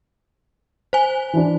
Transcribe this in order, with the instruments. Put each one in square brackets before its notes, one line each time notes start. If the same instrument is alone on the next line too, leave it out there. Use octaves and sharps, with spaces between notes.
[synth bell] C5 G#5
[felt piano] E3 D4